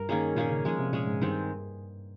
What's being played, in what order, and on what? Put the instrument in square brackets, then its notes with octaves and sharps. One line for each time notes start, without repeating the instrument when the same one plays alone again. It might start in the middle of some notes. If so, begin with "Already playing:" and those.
Already playing: [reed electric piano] G2 [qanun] A#4
[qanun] D#3 A#3 C#4 G#4
[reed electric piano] A#2 [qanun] D#3 A#3 C#4 G#4
[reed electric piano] C#3
[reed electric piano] F3 [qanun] G#3 C#4 G#4
[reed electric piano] C3
[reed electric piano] A#2 [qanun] G#3 C#4 G#4
[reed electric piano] G#2
[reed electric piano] G2 [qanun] D#3 G#3 C4